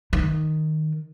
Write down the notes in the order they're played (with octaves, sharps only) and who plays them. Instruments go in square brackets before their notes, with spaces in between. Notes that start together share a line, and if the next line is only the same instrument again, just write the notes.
[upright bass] D#3